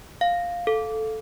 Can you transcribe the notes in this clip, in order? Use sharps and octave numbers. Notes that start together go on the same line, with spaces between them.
F5
A4